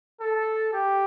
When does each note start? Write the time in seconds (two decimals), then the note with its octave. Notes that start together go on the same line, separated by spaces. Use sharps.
0.21 A4
0.73 G4